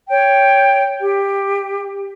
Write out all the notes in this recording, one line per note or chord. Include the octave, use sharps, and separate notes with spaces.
C#5 G5
G4